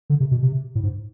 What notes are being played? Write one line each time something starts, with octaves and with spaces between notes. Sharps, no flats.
D3
C3
B2
C3
A2
G#2